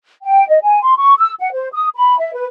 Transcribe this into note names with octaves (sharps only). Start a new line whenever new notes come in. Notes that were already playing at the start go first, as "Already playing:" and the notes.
G5
D#5
G#5
C6
C#6
E6
F#5
C5
D#6
B5
E5
B4